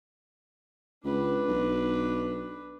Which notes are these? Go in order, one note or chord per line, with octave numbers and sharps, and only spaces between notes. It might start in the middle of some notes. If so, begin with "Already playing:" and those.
C#2 D4 B4
B1